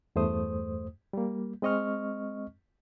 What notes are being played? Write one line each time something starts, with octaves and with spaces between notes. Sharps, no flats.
E2 G2 A3 C5 D#6
G3 A#3
G#3 C4 D#5 C#6 F6